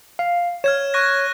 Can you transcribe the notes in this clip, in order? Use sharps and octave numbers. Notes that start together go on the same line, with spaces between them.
F5
C#5 F6 G#6 E7
C#6 F#6 A#6